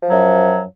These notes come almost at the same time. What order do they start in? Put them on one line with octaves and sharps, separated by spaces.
F3 F#3 F#2